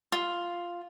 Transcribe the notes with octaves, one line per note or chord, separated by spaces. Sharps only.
F4